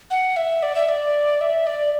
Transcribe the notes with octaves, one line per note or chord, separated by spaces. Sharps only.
F#5
E5
D5
E5
D5
E5
D5